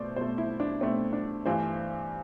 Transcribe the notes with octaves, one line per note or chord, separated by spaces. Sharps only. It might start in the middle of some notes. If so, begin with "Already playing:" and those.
Already playing: B2 A3 C5 D5
B2 A3 C5
E4
D4
B2 A3 C4
D4
G2 E3 A3 C5